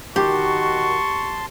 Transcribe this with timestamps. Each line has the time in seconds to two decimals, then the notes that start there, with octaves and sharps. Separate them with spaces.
0.16 D#3 F#4 G4 A5 C6 C#6